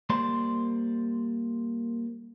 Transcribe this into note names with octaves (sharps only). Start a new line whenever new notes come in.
G3 A#3 C5 D5 C6